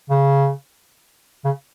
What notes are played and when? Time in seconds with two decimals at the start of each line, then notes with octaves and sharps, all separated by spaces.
0.10 C#3
1.45 C#3